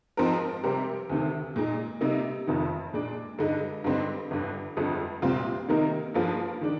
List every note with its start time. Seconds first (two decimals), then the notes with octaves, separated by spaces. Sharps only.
0.17 G#2 F3 C4 D#4 A#4
0.63 C3 G3 C4 G4 A#4
1.10 D2 C3 D#3
1.56 A#2 G#3 D#4
2.01 C3 G3 A#3 D#4
2.47 F1 F2 D#3
2.94 A#2 G#3 D4
3.39 G2 D3 G#3 D#4
3.84 G2 D3 G3 C4 D#4
4.31 G1 G2 D3
4.77 G1 F2 D3 G#3
5.22 C2 A#2 G3 C4 F4
5.68 C3 D#3 A#3 D#4 A#4
6.14 G2 F3 A#3 F4 G#4
6.61 D#3 G#3 D4